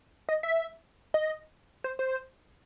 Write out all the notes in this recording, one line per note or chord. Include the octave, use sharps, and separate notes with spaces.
D#5
E5
D#5
C5
C5